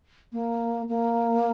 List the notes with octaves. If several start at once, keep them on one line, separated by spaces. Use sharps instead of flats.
A#3
A#3